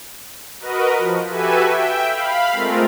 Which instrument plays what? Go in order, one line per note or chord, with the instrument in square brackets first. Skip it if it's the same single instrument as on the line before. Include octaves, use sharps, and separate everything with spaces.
[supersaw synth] F#4 A#4 B4 D#5
F3
F#4 G4 A4 B4 E5 G#5
E5 G5
F5 B5
G#3 A3 C4 F4 A#4